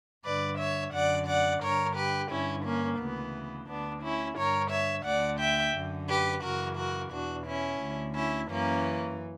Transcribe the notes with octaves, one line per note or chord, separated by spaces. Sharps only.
G2 D3 B4 D5
C#5 E5
F#2 D3 D5 F#5
D5 F#5
G2 D3 A#4 C#5
G4 B4
G2 D3 C#4 E4
A#3 C#4
D2 C#3 E3 B3
D2 D3 B3 D4
C#4 E4
G2 D3 A#4 C#5
C#5 E5
D2 D3 D5 F#5
E5 G5
F#2 D3
G4 B4
F#2 C#3 E3 F#4 A#4
F#4 A#4
E2 B2 D4 F#4
C#4 E4
D2 D3
C#4 E4
F#2 E3 A#3 C#4